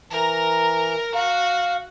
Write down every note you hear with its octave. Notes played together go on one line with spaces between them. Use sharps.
E3 A#4 A#5
F#4 F5